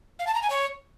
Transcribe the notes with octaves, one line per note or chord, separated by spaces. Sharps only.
F5
A5
A#5
G#5
C#5